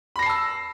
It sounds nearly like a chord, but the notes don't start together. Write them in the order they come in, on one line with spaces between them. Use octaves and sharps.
B5 A#6 C7 A5 E6